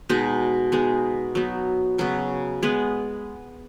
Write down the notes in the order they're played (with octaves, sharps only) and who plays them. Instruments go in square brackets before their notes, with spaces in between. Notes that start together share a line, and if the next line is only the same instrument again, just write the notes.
[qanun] B2 G#3 D#4
G#3 B3 D#4 G#4
F#3 B3 D#4
C#3 F#3 B3
G#3 B3 G#4 B4